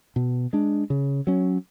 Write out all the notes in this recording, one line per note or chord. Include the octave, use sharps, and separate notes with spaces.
B2
G#3 D4
C#3
F#3 C#4